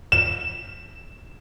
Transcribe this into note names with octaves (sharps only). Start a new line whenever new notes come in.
E7